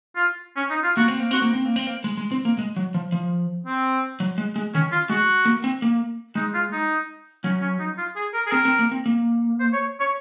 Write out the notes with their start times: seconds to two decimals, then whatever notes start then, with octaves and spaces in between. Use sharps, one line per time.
0.16 F4
0.56 C#4
0.70 D#4
0.83 F4
0.97 A#3 F#4
1.08 C4
1.20 A#3
1.31 C4 F#4
1.42 A#3
1.53 C4
1.65 A#3
1.76 C4
1.87 A#3
2.04 G#3
2.17 G#3
2.32 C4
2.45 A#3
2.59 G#3
2.76 F#3
2.94 F3
3.12 F3
3.66 C4
4.20 F#3
4.38 G#3
4.56 G#3
4.74 D#3 C#4
4.92 F4
5.10 G#3 F#4
5.45 A#3
5.64 C4
5.82 A#3
6.35 G#3 D#4
6.54 F4
6.72 D#4
7.44 F#3 C#4
7.62 C#4
7.79 D#4
7.98 F4
8.16 G#4
8.33 A#4
8.47 G#4
8.52 C4 A#4
8.65 C4
8.79 A#3
8.92 C4
9.06 A#3
9.60 C5
9.73 C#5
10.00 C#5